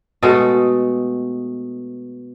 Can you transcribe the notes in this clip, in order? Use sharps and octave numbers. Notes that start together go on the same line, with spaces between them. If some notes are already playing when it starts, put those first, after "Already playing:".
B2 G#3 A3 A4